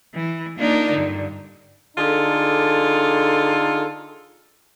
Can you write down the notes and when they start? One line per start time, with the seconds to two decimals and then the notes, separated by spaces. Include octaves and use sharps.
0.16 E3
0.58 A#3 D4 D#4 F4 A#4
0.92 G2 D3
1.97 D3 D#4 F4 G#4 A4